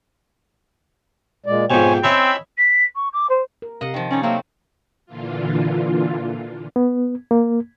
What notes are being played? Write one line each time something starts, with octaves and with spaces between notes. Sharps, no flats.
A#2 G#3 D5
F2 G#2 B2 C5 C#5 G5 G#5
C4 C#4 E4 D#5 B5 E6
B6
C#6
D6
C5
A#4
C3 A#4 D#5 F5 F#5
D#3 F3
C#4 D#4 C#5 D5
F#3 A3 A#3 C4
A#2 D3 E3 F4
B3
A#3